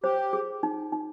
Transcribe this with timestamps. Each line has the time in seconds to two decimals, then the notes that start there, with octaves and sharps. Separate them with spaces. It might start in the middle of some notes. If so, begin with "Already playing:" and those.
0.04 G4 C5
0.33 G#4
0.63 D#4
0.92 D#4